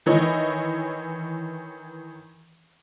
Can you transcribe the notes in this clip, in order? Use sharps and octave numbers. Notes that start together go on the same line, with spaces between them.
D#3 E3 C#5 D#5